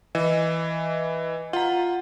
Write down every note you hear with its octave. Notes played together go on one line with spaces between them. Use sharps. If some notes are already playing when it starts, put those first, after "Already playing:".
E3 D#5
F4 F#5 A#5